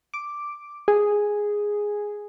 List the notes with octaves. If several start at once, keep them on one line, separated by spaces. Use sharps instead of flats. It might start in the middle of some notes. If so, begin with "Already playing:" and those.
D6
G#4